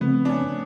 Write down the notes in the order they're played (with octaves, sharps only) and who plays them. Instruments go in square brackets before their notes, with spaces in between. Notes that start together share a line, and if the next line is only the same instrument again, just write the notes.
[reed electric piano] C#3 F3 A3 C4 [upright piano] B3
[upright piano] D4
C#4